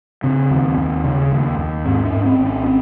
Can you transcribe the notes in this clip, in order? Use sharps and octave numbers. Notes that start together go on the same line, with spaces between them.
C#3 C4
D#2
D#2
C#3
D#2
D#2
G#2 C4
C#4
G#2
C4
G#1
C#4
C4